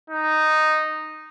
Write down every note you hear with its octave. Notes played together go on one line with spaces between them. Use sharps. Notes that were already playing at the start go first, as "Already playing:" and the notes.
D#4